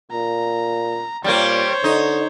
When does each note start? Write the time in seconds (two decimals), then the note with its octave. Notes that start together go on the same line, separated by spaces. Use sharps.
0.11 A#2 A#5
1.24 A#2 G3 A#3 C5 C#5
1.84 D3 D#4